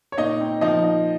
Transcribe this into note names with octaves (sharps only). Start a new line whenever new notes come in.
C#5
A#2 D#4 D#5
C4
F3 D#4 D#5
D#4